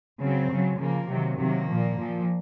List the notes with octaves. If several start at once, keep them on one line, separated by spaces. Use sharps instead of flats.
C#3 F#3 C4
C#3 F#3
C#3 F3 A#3
C3 D#3 F#3
C3 D#3 F#3 A#3
A#2 F3
A#2 F3